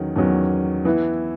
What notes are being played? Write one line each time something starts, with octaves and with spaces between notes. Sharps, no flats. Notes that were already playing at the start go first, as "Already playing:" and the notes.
Already playing: E2 D#3 F#3 C#4
E2 D#3 F#3 C#4
E3 B3 E4